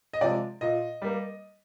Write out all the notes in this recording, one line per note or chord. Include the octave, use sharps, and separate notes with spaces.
D#5
C3 F3 G#3 D5
A#2 D#5
G3 A#3